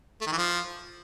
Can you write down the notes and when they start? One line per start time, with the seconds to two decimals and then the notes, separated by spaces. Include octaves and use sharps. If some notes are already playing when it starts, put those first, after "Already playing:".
0.21 A3
0.27 D#3
0.32 E3
0.38 F3